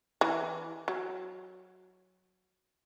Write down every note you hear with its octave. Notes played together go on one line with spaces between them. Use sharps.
E3
F#3